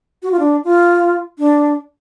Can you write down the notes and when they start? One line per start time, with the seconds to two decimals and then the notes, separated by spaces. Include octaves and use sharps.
0.23 F#4
0.31 F4
0.39 D4
0.64 F4
1.39 D4